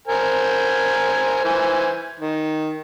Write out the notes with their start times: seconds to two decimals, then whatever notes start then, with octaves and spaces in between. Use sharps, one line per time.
0.07 A#4 C5 G#5
1.44 E3 C5 G#5
2.19 D#3